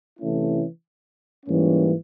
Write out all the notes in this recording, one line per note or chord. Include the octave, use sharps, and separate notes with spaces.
C3 E3 A3 C#4 E4
G#2 E3 G3 A#3 C#4